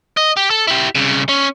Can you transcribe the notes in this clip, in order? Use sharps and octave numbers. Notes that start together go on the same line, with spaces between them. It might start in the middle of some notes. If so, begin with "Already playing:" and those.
D#5
G4
A4
E4 G4
C2 C#3
C#4